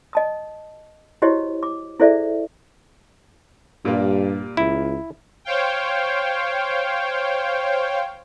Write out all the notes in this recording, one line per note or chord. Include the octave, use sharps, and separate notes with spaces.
D#5 A5 D#6
E4 F#4 G4 C5 C#5 D#5
D6
E4 G#4 A4 C5 D5 E5
G2 A#2 G3 A#3
C#2 E4
C5 C#5 F5 G5